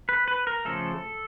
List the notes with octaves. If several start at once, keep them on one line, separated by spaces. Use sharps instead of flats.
B4
B4
A#4
C#3 F3 A3 A4